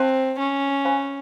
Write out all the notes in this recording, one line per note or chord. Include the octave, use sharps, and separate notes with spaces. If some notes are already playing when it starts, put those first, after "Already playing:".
Already playing: C4 C5 F5 A5 C6
C#4
C5 F5 G#5 B5